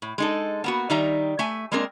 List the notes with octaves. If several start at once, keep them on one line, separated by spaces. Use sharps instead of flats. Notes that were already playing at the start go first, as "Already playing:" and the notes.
A2
G#3 D#4 A4
A#3 B3 F#4
D#3 G3 D#4 E5 A#5
A3 E5 G#5
G#3 A#3 C4 D4 A#4